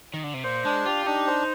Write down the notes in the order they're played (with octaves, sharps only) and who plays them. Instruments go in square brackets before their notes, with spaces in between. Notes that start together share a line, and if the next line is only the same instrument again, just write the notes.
[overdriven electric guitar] D#3
D3
C3
[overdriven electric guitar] A#2 [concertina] C5
[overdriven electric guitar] G#3 [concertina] D4
[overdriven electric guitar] F4 [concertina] G4
[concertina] D4 [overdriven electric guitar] D#4
[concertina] C5